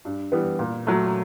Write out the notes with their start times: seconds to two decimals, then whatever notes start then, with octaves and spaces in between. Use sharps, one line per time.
0.05 G2
0.32 E3 G3 B3
0.59 A#2
0.87 F#3 A3